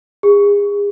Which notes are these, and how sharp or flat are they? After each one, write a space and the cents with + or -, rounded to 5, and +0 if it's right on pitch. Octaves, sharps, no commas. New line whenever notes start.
G#4 -35